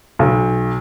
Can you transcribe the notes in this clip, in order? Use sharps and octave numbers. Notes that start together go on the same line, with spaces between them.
B1